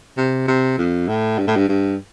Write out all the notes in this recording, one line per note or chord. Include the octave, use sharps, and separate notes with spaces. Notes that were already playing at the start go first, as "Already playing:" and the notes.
C3
C3
F2
A2
G2
A2
G2
G2